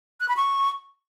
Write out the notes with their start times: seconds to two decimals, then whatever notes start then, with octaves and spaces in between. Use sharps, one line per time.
0.20 F#6
0.29 B5
0.37 C#6